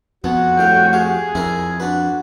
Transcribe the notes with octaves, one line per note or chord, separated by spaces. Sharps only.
F2 B3 F#4
C2 A2 F5 G5
G4 G#4 F5
F2 E4 A#4
D4 F#4 B4